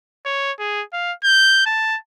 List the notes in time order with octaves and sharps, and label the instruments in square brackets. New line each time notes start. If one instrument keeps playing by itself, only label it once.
[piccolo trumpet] C#5
G#4
F5
G6
A5